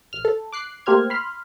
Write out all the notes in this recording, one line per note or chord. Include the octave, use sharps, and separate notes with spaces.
A#1 F6
A4
D6 F#6 C7
A3 A#3 G4 C5 F6 G#6
B5 C6 F6